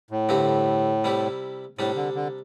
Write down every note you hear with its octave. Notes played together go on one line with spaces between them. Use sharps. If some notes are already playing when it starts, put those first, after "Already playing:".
A2
G2 D3 C4 G4
C3 G3 E4 G4
A2 C3 G3 D4 G4
D3
D3